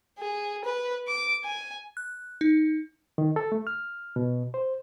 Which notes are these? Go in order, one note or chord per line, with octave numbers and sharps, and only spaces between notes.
G#4
B4
D6
G#5
F#6
D#4
D#3
A4
A3
F6
B2
C5